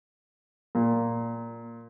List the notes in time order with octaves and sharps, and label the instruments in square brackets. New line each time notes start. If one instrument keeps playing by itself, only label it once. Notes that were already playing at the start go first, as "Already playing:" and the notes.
[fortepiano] A#2